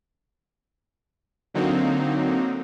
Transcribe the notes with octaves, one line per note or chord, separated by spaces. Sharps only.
D3 F#3 A#3 C4 D#4